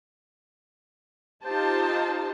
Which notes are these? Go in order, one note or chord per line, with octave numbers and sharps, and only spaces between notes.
D#4 F4 G4 C5 A5